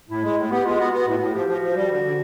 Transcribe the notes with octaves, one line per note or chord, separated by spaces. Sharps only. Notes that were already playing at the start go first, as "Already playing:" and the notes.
A2 E4
G#3
A2
B3 G4
G#3 F4
B3 F#4
B3 F#4
A2
A2
F3 G4
F3
F#4
F3
G3
D3
D3